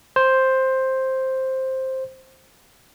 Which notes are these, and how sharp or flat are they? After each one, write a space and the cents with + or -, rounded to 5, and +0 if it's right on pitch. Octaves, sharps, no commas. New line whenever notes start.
C5 +5